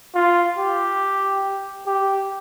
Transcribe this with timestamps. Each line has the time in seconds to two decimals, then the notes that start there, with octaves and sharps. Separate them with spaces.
0.15 F4
0.58 G4
1.86 G4